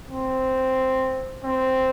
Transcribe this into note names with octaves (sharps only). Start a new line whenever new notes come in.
C4
C4